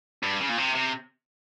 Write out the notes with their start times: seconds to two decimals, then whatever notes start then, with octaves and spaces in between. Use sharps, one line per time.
0.23 G2
0.40 C#3
0.49 A#2
0.58 C3
0.75 C3